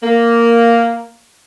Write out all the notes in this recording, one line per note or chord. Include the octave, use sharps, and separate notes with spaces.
A#3